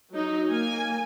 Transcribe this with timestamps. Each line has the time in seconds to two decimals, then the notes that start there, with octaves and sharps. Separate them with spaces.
0.13 F#3 D#4
0.50 A#3 G#5